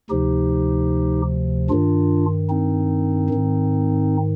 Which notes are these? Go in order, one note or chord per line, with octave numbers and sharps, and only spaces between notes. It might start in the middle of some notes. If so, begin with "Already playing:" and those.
D2 C3 F3 D#4 G4
G2 D#3 D4 F4
C4 D#4
G#2 D#3